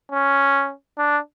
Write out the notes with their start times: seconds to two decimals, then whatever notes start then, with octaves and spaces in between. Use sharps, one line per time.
0.12 C#4
0.98 D4